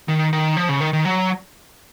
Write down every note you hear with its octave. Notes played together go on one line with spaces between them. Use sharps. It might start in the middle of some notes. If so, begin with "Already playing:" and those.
D#3
D#3
F3
C#3
D#3
D#3
F#3